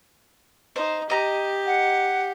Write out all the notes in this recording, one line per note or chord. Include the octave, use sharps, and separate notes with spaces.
D#4 C5
G4 D#5 A#5
F#5